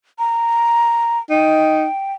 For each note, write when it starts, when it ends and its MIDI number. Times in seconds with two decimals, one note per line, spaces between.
0.19 1.18 82
1.30 1.85 63
1.30 2.13 79